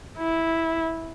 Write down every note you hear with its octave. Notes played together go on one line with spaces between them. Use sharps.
E4